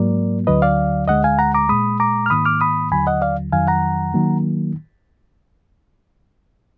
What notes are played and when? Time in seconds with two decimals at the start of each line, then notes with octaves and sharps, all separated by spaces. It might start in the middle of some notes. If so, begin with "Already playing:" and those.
Already playing: G#2 F#3 A#3 A#4 D5
0.47 D2 D3 F#3 B4 D#5
0.62 D5 F5
1.08 D2 D3 G#3 D#5 F#5
1.24 F5 G#5
1.39 F#5 A#5
1.54 A#5 D6
1.69 A#2 G#3 B5 D#6
2.00 A#5 D6
2.26 F6
2.30 G#2 D#3 A#3 B5 D#6
2.46 D6 F6
2.61 B5 D#6
2.91 D#2 D3 F#3 G#5 B5
3.07 D#5 F#5
3.22 D5 F5
3.53 F2 D#3 F#3 F5 G#5
3.67 F#5 A#5
4.14 D#3 F#3 A#3